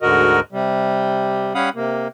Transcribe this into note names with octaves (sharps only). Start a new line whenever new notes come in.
D2 G#2 D3 F#4 A#4 D#5
C3 G3
G3 C#4 F5 F#5 B5 D#6
C3 A#3